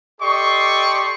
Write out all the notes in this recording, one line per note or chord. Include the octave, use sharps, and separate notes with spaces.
G4 A4 D5 D#5 C6 C#6